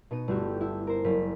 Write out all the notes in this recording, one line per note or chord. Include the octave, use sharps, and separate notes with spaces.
B2 B3 D#4 D#7
G1 A3 E4 F#4 G4 G6
E4
A#4 C5
F#1 C#4 B6